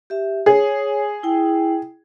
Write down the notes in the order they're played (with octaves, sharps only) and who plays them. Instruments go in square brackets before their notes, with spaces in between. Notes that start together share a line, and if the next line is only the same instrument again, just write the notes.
[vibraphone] G4 E5
[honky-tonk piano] G#4 [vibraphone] C#5
[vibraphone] E4 G5